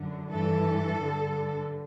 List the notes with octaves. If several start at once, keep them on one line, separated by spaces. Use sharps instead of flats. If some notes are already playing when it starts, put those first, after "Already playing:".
Already playing: F#2 D3
G2 E3 A4
G2 D3